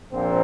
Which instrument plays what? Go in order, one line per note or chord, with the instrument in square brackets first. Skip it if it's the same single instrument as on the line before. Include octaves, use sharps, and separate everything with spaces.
[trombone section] A#1 A#2 F3 C4